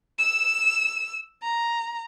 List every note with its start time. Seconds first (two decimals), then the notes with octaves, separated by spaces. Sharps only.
0.18 E6 E7
1.43 A#5